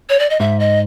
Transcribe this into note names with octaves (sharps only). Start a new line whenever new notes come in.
C#5
D5
D#5
G#2 E5
D#5